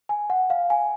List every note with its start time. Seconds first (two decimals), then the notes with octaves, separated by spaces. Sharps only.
0.09 G#5
0.30 F#5
0.50 F5
0.70 G#5